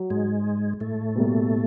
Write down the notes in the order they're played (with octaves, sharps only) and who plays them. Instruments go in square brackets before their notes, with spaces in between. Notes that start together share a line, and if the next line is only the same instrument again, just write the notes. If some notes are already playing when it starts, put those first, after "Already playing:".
Already playing: [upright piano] F#3
[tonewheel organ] G#2 G#3
A2 A3
[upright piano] B2 G3 A#3